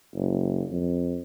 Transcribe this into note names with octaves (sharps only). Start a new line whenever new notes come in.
F#1
F2